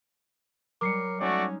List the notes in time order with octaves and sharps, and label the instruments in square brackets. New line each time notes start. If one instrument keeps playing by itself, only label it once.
[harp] F#3 G3 [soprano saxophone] A#4 [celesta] D6 C7 C#7
[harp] G#3 D#4 [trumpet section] A3 F#4 D5 [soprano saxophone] C#4